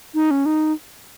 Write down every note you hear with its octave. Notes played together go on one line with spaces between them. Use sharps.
D#4
C#4
D#4